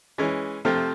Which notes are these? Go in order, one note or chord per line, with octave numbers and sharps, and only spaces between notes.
E3 G#3 C#4
C3 F3 A3 C4 F4